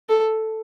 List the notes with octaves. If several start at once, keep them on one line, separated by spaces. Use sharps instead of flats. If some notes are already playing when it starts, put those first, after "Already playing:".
A4